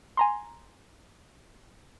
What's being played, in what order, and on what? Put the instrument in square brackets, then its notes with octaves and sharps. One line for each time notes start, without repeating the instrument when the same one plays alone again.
[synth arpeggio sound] G#5 A#5 C6